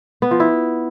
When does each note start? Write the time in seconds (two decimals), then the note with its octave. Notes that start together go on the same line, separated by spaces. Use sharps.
0.22 B3
0.31 F3
0.40 E4